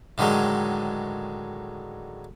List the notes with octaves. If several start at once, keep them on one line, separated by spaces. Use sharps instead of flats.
A2 D3 D#3 F#3 G#3